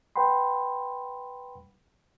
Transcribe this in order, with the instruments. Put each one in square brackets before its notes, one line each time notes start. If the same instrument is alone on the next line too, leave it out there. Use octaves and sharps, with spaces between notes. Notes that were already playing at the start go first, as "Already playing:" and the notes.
[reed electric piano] B4 F#5 G5 B5 C6